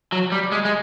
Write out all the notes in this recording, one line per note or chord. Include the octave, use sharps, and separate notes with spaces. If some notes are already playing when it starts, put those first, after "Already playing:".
F#3
G3
G#3
G#3